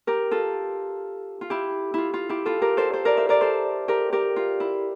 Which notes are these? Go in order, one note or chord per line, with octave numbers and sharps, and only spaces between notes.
G4 A#4
F4 A4
F4
E4 G4
E4 F4
F4
E4 G4
F4 A4
G4 A#4
A4 C5
A4 C5
A#4 D5
C5 E5
A#4 D5
A4 C5
G4 A#4
G4 A#4
F4
E4